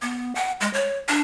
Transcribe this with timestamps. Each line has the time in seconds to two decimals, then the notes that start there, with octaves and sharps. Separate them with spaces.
0.02 B3
0.35 F#5
0.61 G#3
0.73 C#5
1.08 D4